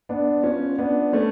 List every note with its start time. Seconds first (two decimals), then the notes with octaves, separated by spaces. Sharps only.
0.09 B3 D4
0.43 C#4 F4
0.78 B3 D4
1.13 A3 C#4